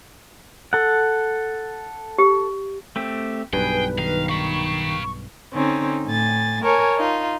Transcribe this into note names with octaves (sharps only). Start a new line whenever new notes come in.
A4 F#5
G4
A3 C4 G4
B1 G2 G#4 B4 G5
D#3 F5
F5 B5 C#6
D3 C4 C#4 D#4
A2 G#5 A6
A#4 C#5 G#5 A5
D#4 F4